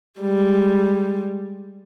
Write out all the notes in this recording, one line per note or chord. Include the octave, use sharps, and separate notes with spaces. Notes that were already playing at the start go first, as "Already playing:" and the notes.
G3 G#3